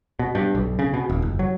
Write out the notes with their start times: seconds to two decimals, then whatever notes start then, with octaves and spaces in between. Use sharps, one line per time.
0.19 B2
0.35 G2
0.55 B1
0.79 C#3
0.94 B2
1.10 D#1
1.22 F#1
1.39 F#3